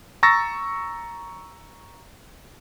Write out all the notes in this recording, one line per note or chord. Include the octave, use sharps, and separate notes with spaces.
A#5 C#6 E6 A6 A#6